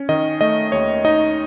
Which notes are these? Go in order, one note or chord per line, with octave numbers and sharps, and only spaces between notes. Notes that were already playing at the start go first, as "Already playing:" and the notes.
Already playing: C#4
D#3 D#5
A3 D#5
D#2 C#5
D#4 D#5